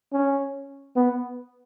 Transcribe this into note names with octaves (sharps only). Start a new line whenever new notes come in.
C#4
B3